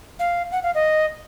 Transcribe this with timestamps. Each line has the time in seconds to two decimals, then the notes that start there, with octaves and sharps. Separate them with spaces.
0.19 F5
0.52 F#5
0.63 F5
0.75 D#5